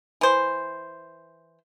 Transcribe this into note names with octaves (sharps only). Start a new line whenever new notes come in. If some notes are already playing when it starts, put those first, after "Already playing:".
E3 C5